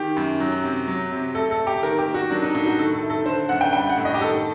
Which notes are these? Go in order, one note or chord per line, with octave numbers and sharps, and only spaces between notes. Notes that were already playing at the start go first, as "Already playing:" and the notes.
Already playing: D#3 G4
F#2
F#3
C3
F#3
C3
A3 A4
A4
A3
G4
D#3 A#4
G4
A#3
F#4
F#3 D4
D#4
A2 D#4
F#4
D#3 A4
A4
A3
A4
D3 C5
F#2 F#5
G5
G3 G5
F#5
A2
D#5
G4
D#3 A4